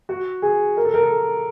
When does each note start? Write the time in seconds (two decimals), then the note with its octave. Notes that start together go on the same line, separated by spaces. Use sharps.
0.09 F#4
0.42 G#4
0.77 A#4
0.85 A4
0.94 A#4
1.03 A4